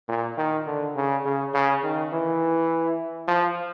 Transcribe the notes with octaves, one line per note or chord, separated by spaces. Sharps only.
A#2
D#3
D3
C#3
C#3
C#3
D#3
E3
F3